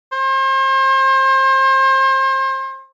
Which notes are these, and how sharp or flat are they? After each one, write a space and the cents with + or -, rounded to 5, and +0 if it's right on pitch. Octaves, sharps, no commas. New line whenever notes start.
C5 +35